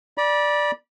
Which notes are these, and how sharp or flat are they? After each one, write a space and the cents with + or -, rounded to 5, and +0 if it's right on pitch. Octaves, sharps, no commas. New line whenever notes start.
D5 +0 B5 -35